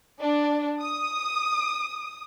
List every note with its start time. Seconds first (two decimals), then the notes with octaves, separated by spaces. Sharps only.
0.20 D4
0.80 D#6